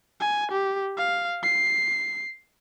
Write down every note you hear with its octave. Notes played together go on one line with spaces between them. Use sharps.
G#5
G4
F5
C7